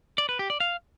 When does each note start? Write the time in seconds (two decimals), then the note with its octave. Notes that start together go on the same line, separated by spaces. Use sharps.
0.18 D5
0.29 B4
0.39 G4
0.50 D5
0.60 F5